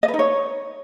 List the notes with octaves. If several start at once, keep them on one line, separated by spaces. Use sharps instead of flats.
D#5
B4
D#4
C#5